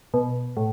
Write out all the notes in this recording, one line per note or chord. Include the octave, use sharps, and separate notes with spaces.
B2
A2